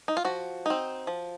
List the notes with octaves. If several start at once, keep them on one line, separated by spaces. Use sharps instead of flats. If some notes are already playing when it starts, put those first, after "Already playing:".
D#4
F4
F3 F#4
C4 D#4
F3